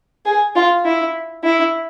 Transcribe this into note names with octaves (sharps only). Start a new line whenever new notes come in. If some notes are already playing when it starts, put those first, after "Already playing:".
G#4
F4
E4
E4